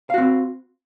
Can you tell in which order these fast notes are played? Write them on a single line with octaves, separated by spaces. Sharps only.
F5 F#4 C4